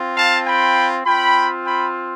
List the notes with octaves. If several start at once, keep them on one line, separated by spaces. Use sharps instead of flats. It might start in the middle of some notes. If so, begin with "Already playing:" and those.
Already playing: C4 F4
F5 A5
G5 B5
C4 F4 G5 B5
G5 B5